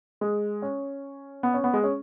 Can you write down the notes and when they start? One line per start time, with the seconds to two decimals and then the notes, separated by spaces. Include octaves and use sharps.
0.21 G#3
0.62 C#4
1.43 B3
1.54 C#4
1.64 B3
1.74 G#3
1.84 C#4